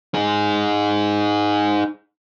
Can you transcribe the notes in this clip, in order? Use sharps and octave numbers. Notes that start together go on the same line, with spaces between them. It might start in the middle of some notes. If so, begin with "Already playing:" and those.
D#4 G#4